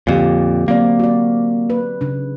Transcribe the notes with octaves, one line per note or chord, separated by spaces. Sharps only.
F2 A#2 D3 G4
F#3 A#3 C4 D5
F#4 D5
B4
C#3 D4